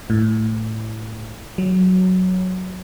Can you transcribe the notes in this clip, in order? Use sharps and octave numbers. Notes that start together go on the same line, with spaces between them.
A2
F#3